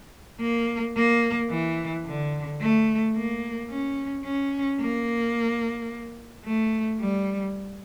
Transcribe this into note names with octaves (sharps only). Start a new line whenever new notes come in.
A#3
A#3
E3
D3
A3
A#3
C#4
C#4
A#3
A3
G3